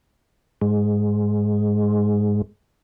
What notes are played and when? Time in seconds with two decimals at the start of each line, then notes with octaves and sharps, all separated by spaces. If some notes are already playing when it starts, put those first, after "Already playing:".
0.61 G#2 G#3